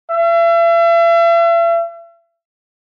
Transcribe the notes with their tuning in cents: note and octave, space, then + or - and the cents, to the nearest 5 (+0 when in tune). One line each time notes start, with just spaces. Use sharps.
E5 +40